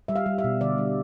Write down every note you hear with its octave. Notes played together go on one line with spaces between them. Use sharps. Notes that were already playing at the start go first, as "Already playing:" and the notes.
G3 E5
F5
G3
E5
B2
D3 D5
G3